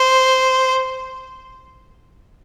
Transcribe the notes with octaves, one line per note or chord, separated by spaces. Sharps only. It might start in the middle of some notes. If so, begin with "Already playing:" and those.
Already playing: C5